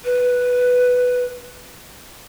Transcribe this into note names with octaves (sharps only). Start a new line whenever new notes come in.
B4